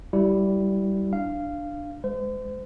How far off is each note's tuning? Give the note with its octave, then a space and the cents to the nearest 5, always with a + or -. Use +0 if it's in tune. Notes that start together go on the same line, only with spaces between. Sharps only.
G3 -15 E4 +0
D4 +5 F5 -10
G#3 +0 C5 -40